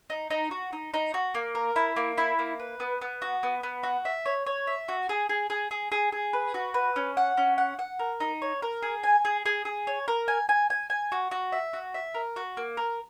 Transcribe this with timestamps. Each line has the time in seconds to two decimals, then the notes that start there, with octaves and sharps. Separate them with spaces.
0.10 D#4
0.30 D#4
0.51 F#4
0.73 D#4
0.94 D#4
1.14 F#4
1.35 A#3
1.55 A#4
1.76 E4
1.96 A#3
2.18 E4
2.39 A#3
2.59 B4
2.80 B3
3.01 B3
3.22 F#4
3.43 B3
3.63 B3
3.83 F#4
4.05 E5
4.26 C#5
4.46 C#5
4.67 E5
4.88 F#4
5.09 G#4
5.29 G#4
5.50 G#4
5.71 G#4
5.92 G#4
6.12 G#4
6.33 B4
6.54 F#4
6.74 B4
6.96 C#4
7.17 F#5
7.37 C#4
7.58 F#5
7.79 F#5
7.99 A#4
8.20 D#4
8.42 C#5
8.62 A#4
8.82 G#4
9.03 G#5
9.25 G#4
9.46 G#4
9.65 G#4
9.87 C#5
10.08 A#4
10.28 G#5
10.49 G#5
10.70 G#5
10.90 G#5
11.12 F#4
11.31 F#4
11.52 E5
11.73 F#4
11.94 E5
12.14 A#4
12.36 F#4
12.57 A#3
12.77 A#4